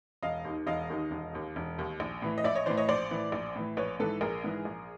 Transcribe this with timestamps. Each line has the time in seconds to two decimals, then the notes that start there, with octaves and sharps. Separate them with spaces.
0.23 E1 D#5 F5
0.45 D#2 D#3
0.67 E1 D#5 F5
0.90 D#2 D#3
1.11 E1
1.33 D#2 D#3
1.56 E1
1.78 D#2 D#3
2.00 A#1
2.22 A2 E3
2.38 D#5
2.44 A#1 D5 E5
2.55 C#5 D#5
2.66 A2 E3 C5 D5
2.77 C#5 D#5
2.88 A#1 C5 D5
3.11 A2 E3
3.32 A#1
3.55 A2 E3
3.77 A#1 B4 C#5
4.00 G#2 E3 A4 B4
4.21 A#1 G#4 A#4
4.44 G#2 E3
4.65 A#1